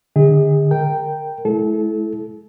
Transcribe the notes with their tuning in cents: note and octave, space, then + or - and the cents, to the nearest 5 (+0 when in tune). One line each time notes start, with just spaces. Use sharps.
D3 +10 G#4 -40 D#5 +35
A#4 -10 G5 +0
A3 -45 E4 +0 A4 -35